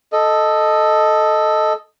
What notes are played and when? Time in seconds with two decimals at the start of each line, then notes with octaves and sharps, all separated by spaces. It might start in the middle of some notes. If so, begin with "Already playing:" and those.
0.12 A4 D#5